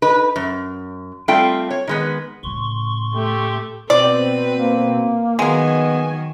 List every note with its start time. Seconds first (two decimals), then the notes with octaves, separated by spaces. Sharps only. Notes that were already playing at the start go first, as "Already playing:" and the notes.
0.02 D#4 B4
0.36 F#2
1.28 G3 A3 C4 F4 G5
1.71 C#5
1.87 D#3 G#3 B3
2.43 A2 C#3 C6 C#6
3.15 A3 G4
3.90 B2 C4 B4 D5
4.57 A#3
5.39 D#3 F#3 G#3 A#3 B3 G#5